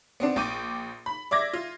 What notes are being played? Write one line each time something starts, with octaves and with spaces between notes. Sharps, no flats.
B3 C4 D4
A#1 G5 C#6 D6 D#7
B5
D5 E5 D6 G#6 A#6
F4